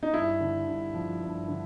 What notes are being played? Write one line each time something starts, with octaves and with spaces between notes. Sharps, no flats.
D#4
G2 E4
D3
G2
F3
G2
D3